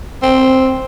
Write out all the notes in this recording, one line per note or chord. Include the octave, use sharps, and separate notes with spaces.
C4